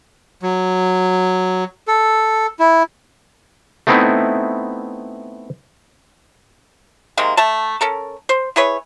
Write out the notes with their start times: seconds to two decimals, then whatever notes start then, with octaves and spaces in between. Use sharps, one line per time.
0.42 F#3
1.88 A4
2.59 E4
3.87 A3 B3 C4 D#4 E4
7.17 C3 D#3 G#3 A#3
7.37 A3 A5
7.81 C#4 A4 A#4
8.29 C5
8.56 E4 G#4 B4 C#5